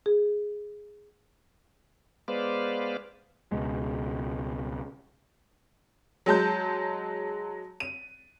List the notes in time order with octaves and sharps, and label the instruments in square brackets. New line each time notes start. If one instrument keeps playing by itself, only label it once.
[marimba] G#4
[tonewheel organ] G#3 B3 B4 C5 D5 F5
[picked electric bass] C#2 B2 G#3
[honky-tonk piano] F#3 G#3 A5 G6
D#7